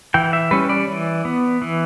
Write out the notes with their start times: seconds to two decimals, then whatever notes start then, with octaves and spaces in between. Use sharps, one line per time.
0.14 E3 G5
0.33 E5
0.51 G3 C#4 B4
0.69 D5
0.88 E3
1.25 B3
1.62 E3